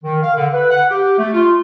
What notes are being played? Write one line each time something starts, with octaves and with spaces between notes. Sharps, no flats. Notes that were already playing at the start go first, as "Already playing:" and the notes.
D#3
F5
D3
B4
F#5
G4
A3
F4